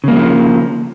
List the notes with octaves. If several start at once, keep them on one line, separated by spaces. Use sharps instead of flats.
C#3 F3 F#3 A#3